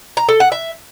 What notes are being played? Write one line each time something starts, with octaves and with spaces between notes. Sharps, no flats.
A#5
A4
F#5
E5